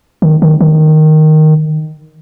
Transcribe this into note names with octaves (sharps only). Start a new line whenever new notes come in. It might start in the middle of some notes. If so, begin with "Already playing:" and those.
D#3
D#3
D#3